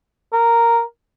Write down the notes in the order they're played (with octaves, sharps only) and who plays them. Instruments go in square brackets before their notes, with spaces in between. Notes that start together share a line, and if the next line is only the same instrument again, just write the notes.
[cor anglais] A#4